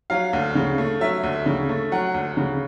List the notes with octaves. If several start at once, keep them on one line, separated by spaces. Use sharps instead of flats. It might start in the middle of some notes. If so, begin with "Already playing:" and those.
F#3 F5
D2
C#3
A3
F#3 E5
D2
C#3
A3
F#3 F#5
D2
C#3